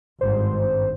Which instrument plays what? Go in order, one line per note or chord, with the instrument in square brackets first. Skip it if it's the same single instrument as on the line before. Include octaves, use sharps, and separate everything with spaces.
[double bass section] G#1 G2 [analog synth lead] C5